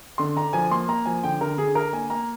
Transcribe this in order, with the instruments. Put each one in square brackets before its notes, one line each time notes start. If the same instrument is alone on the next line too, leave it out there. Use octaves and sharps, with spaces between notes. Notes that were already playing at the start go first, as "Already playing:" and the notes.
[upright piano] D3 C6
D3 A#5
F3 G#5
A#3 C6
A#3 A#5
F3 G#5
D3 G5
D3 A#4
D3 G#4
D3 A#4
A#3 G#5
A#3 A#5